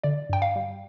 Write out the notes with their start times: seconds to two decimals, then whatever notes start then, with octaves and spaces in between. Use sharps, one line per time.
0.03 D3 D5
0.29 G2 G5
0.42 F5
0.56 G3